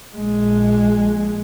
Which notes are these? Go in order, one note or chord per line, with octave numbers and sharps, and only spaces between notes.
A#1 G#3